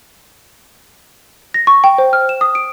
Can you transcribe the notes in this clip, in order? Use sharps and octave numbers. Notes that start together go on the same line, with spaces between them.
A#6
C#6
G5
C5
F6
E7
D#6
D7